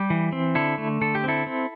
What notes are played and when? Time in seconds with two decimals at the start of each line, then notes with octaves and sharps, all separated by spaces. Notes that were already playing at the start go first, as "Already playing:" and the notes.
Already playing: G3 G4
0.10 E3
0.32 C4
0.55 D3 E4 A4
0.78 A3
1.01 D3 A4
1.15 G4
1.24 C4 E4 A4
1.47 C4